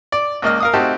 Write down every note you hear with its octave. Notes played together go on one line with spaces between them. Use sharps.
D5
C#2 A#3 D#5 F6
A#4 F5 D#6
A3 C4 D#4 F#4 G4 A5